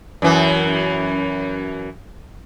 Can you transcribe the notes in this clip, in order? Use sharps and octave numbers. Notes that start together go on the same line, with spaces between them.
F#2 E3